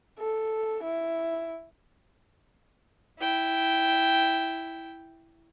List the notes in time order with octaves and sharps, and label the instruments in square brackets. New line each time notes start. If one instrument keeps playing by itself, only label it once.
[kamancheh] A4
E4
[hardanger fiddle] E4 G5